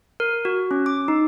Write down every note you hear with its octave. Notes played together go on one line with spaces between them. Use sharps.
A#4
F#4
C#4
D6
D#4